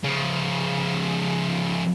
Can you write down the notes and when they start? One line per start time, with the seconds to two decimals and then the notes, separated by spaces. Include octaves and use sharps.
0.04 C#3 F3